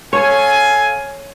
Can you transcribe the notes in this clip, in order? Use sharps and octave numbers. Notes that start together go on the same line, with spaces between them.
A4 C#5 F5 G#5